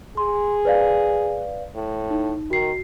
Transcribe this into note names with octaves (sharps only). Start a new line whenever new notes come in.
G#4 C6
B4 D5 F5
A2
D#4
D#3 F#4 C7